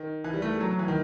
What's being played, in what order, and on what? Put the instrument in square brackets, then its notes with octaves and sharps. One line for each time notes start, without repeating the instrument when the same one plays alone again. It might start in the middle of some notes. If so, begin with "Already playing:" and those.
Already playing: [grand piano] D#3
E3
G3
A3
G3
F#3
F#3
E3
D#3